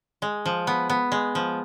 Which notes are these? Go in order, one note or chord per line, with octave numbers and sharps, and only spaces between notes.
G#3
F3
B3
B3
G#3
F3